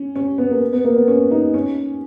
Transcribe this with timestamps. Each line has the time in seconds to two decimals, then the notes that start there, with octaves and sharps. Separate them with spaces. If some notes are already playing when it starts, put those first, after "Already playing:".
Already playing: C#4
0.16 C#4
0.38 B3
0.50 A#3
0.73 B3
0.85 A#3
0.96 B3
1.08 C#4
1.31 D#4
1.54 C#4